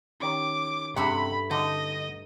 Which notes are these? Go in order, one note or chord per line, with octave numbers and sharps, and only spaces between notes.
D#3 C#4 G4 D6
G2 C3 A3 F#5 B5
D3 D#4 D#5 E5